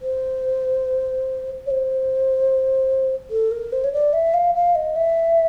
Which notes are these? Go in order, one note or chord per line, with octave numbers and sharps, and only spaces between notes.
C5
C#5
C5
A4
A#4
C5
C#5
D5
E5
F5
F5
D#5
E5